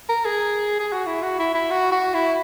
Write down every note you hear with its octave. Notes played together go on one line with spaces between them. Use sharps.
A#4
G#4
G#4
F#4
E4
F#4
E4
E4
F#4
F#4
E4